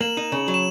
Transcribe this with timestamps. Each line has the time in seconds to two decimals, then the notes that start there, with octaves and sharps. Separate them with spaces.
0.01 A#3 E7 F#7
0.17 D#4
0.32 C#3
0.48 F#3
0.54 E7